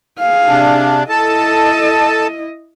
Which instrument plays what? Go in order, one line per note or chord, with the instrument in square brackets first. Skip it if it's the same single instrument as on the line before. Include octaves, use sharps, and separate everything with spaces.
[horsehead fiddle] G#4 F5
[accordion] C3 D4
[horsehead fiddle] E4 D#5 [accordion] A4 A5